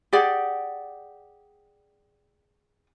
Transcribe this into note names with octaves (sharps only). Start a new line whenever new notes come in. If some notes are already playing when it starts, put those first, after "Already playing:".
G4 G#4 D5 F#5